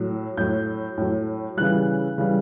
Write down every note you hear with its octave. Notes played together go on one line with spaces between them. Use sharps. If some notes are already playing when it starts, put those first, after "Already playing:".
Already playing: A2 F#3
A2 F#3 G6
A2 F#3
C#3 E3 G3 F#6
C#3 E3 G3